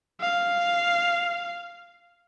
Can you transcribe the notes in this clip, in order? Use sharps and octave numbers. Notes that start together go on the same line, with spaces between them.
F5